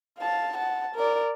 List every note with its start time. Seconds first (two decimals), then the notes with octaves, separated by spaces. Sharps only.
0.19 F5 A5
0.56 F#5 A5
0.95 A#4 D5